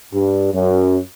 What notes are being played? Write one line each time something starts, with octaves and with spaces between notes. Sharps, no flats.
G2
F#2